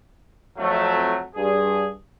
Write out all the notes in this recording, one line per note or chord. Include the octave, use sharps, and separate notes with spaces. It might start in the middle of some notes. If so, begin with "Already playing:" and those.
F2 F#3 A3
G2 G#4